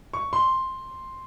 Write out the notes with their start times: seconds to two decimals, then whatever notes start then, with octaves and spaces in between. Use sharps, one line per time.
0.14 C#6
0.33 C6